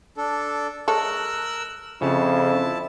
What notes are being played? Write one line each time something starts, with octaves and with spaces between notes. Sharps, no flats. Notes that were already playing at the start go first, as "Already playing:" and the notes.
D4 A4
G#3 A4 A#4 C#5 E6 F#6
F2 C#3 E4 A5